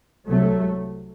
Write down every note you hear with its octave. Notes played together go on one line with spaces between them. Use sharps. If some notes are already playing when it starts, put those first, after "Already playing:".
C2 C3 F#3 A3